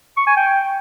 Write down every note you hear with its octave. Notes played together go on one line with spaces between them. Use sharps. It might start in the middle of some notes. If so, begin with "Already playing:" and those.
C#6
G#5
G5